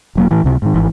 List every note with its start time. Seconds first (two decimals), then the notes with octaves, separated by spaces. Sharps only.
0.15 E1 F#3 A#3
0.31 A2 E3
0.44 C#2 C3
0.62 G#2 D#3
0.74 G#1 E3